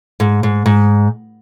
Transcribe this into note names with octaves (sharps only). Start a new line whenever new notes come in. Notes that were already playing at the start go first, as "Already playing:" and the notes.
G#2
G#2
G#2